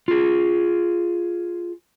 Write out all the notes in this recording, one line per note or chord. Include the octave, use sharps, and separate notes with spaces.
F4 G#4